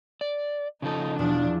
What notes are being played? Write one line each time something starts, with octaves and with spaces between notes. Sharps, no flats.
D5
C#3 F3 D#4 A4
E2 B2 F3 D4